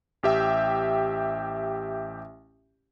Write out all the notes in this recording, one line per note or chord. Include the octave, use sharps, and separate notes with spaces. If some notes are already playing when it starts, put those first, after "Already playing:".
A1 G4 E5 G5